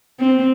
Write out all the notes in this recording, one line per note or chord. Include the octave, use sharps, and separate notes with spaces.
C4